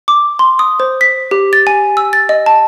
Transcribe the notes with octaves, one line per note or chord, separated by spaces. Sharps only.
D6
C6
D#6
C5
B6
G4
A6
G#5
E6
A6
D#5
A5